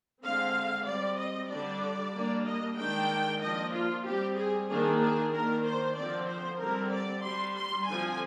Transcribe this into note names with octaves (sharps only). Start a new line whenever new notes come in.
D3 G#3 C4 F5
G3 C4 D5
D#5
D3 G3 D4 D5
G3 A#3 D4
D#5
D#3 G#3 D4 G5
F3 A#3 D4 D#5
F4
G3 C4 G4
G#4
D#3 A#3 D4 G#4
G#4
D#3 A#3 D4 A#4
C5
D3 F3 C4 D5
C5
D3 G3 C4 A#4
D5
G3 D4 C6
C6
D3 F3 C4 G#5